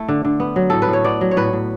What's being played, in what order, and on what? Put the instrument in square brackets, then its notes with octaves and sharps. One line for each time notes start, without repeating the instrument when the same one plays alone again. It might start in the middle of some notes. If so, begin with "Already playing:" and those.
Already playing: [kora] A3 E4
D3
D3
B3
F#3
A2 A4
B4
A2
C#5
B3 D5
F#3
C#5
A2 B4
A2